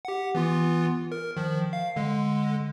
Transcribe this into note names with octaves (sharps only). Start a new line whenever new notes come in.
G4 F#5
E3 B3 F4
A#4
D#3 F3
F5
D3 G#3